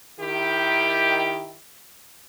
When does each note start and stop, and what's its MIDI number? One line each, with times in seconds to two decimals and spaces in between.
0.19 1.58 51
0.19 1.58 64
0.19 1.58 67